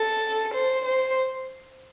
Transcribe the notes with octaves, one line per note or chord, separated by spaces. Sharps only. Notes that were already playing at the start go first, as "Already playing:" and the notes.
Already playing: A4
C5
C5